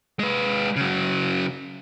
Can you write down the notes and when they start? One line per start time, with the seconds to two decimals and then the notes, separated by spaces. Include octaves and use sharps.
0.19 G#3 B4
0.76 C#3 F#3